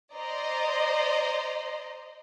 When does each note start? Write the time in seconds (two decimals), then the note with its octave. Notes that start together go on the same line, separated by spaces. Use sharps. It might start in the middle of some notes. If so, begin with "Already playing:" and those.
0.16 C5 D5 D#5 A#5 C6